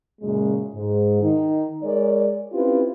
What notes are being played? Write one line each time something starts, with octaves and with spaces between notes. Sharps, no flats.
F#2 A#2 C#3 G#3
G#2
D#3 D#4
G#3 A#4 C#5 D5
C4 C#4 E4 F4 G4 B4